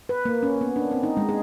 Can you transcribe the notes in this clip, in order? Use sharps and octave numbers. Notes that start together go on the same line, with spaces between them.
B4
A#3
C#4
B3
D4
C4
D#4
G#3
G#4